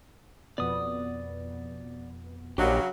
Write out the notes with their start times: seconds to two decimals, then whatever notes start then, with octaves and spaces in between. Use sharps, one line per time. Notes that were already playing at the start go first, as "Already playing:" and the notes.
0.58 F2 B2 B3 D5 D#6
2.58 A#1 C#3 F#3 D4 G4 A#4 D#5